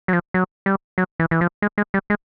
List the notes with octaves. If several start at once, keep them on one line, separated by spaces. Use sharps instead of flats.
F#3
F3
F#3
G3
F#3
E3
E3
F3
G#3
G#3
G3
G#3